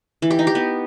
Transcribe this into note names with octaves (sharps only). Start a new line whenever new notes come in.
E3
G4
D#4
G4
B3